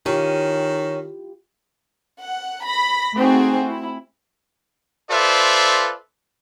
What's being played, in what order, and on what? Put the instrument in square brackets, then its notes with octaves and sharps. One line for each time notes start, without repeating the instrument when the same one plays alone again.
[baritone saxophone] D#3 [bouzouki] C#4 [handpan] E4 F4 G4
[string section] F#5
B5 A#6
A3 C4 D#4 F#4 G#4
E4
[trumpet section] F4 A4 B4 C5 D5 E5